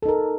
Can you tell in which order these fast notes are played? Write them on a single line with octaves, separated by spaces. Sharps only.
A4 D#4 A#4